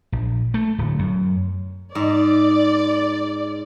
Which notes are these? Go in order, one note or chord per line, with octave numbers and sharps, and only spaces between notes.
A#1
A3
D1
F#2
G#2 D5